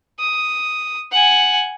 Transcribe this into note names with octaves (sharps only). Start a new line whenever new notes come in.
D#6
F#5 G#5